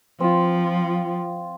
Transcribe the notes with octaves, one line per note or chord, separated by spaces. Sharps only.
F3 C4 F4